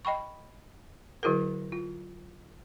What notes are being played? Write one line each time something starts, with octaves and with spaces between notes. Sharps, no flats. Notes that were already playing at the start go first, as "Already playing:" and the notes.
D#5 G5 B5 C#6
D3 F#3 E4 F#4 G#4 A#4
F4